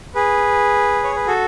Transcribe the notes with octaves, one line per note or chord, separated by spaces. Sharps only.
G#4 B4
C#5
B4
F#4 A4